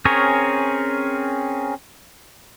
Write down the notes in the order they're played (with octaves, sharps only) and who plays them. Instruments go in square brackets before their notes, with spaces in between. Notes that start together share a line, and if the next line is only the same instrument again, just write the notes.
[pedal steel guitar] C4 C#4 G#4 A#4 C#5